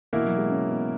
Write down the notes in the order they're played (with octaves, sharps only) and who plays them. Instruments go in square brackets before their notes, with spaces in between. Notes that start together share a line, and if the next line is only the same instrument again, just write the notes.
[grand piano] B2 A#3 E4 A#4 [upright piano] E3
[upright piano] F#3
G#3
C#4
B3